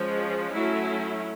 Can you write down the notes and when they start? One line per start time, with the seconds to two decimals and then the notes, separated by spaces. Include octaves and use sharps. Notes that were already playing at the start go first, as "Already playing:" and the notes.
Already playing: F3 G#3 C#4
0.54 F#3 A3 C#4 E4